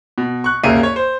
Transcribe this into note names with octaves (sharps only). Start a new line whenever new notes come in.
B2
C#6 F#6
G#1 D#2 C#3 A#3 E5 D#7
C#5
C5